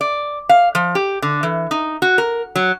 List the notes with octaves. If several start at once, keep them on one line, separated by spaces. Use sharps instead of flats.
D5
F5
F3
G4
D3
E3
D#4
F#4
A#4
F#3